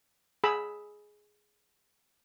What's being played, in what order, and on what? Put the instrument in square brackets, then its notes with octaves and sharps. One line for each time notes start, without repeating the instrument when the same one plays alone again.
[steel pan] G#4 B5 E6